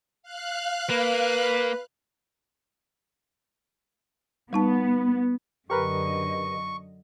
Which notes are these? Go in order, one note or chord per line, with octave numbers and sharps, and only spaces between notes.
F5 F#6
A#3 B4
G3 B3 D#4 A5
F#2 D3 G4 A#4 B4 D#5 C#6